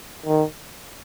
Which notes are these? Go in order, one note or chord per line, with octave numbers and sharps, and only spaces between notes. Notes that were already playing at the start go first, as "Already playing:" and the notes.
D#3